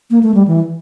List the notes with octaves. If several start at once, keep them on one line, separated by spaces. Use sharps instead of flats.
A#3
A3
G3
E3